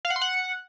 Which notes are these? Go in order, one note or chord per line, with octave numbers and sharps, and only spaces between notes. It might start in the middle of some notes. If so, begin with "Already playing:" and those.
F5
F#5
C6
F#5